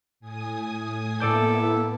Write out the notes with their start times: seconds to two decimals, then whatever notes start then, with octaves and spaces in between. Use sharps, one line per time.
0.20 A2 G#5 D#6
1.20 A2 A#3 B3 E4 A4 D5 G6